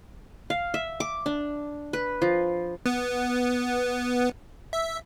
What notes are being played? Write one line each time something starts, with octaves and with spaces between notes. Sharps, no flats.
F5
E5
D6
D4
B4
F3
B3
E5